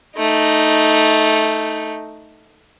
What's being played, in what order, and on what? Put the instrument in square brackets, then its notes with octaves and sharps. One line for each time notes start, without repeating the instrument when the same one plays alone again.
[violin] A3 D#4